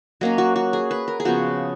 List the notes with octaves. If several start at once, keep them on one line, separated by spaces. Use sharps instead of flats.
F#3 A#3 C#4 D#5
F#4
F#4
G#4
B4
A#4
G#4
C#3 F3 B3 F#4